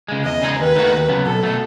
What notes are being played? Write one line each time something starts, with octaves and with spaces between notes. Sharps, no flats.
C#3 G#3
E2 D#5
C#3 G#3 D#4 G#4
D#2 B4
D#3 A3 D#4 F#4
D#2
C#3 F#3 B3
B1 A4
B2 A3